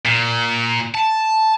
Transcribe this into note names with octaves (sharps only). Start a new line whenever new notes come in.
A#2
A5